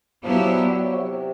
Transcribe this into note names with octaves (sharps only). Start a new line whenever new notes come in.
F3 F#3 B3 E4 G4
G3
F#3
C3